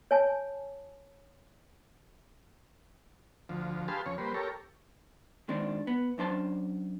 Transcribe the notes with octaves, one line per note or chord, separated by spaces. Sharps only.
C#5 G#5 A5
D2 F3
G4 G#4 B4 F5 A5 C6
F2 C#3 C#5
G3 A#3 B4 C5
G4 A4 A#4 C#5
D#3 G#3 C4 D4
B3
F#2 D4 C5 A5